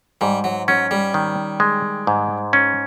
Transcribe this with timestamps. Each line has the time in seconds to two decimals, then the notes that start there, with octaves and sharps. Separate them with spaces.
0.21 G#2 G3
0.44 F#3
0.68 F#3 C#4
0.91 G3
1.14 D#3
1.60 G#3
2.07 G#2
2.53 C#4